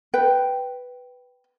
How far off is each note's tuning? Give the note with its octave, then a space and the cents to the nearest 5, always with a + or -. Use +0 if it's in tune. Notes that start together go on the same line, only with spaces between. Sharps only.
B4 +0 G5 -5